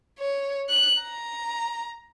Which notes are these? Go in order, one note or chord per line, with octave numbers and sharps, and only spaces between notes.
C#5
F#6
A#5